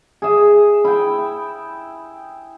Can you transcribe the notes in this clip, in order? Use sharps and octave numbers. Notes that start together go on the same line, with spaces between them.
G#4 E5
E4 G5